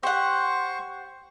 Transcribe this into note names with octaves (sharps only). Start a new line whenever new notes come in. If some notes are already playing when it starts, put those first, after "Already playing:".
G4 C5 F#5 C#6